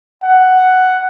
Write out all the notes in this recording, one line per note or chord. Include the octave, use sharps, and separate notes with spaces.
F#5